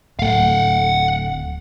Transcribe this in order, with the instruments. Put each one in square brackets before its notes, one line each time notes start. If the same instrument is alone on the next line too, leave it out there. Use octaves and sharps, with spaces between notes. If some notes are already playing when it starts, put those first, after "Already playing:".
[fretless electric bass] D1 A3 [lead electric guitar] F5 F#5